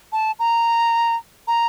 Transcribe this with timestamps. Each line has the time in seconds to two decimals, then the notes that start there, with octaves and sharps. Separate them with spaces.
0.12 A5
0.39 A#5
1.48 A#5